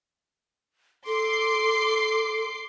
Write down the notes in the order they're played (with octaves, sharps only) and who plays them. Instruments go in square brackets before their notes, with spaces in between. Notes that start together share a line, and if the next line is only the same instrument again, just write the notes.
[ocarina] A4 [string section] C6 D6 C7